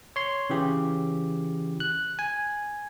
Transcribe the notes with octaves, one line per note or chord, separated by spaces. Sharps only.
C#5 C6
C#3 E3 G4
F#6
G#5